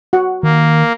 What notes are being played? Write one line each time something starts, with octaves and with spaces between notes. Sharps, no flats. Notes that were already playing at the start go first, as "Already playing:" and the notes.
F#4 F#5
D#3 A#3